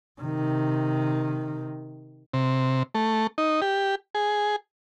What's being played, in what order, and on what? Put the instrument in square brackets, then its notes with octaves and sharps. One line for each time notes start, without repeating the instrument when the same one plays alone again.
[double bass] C3 D#3
[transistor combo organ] C3
A3
D#4
G4
G#4